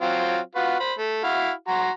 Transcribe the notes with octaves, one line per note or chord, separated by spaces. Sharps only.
F#3 C4 F4
F4 F#4 B4
C5 B5
A3
E4 F#4 F5
F#4 A#5 C6